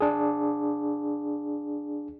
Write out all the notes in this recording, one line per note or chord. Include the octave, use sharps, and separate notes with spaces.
D4 G#4